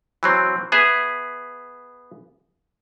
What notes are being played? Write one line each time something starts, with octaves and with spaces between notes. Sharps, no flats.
E3 F#3 C4
B3 G#4 E5